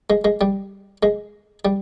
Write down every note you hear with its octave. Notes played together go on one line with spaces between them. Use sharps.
G#3
G#3
G3
G#3
G3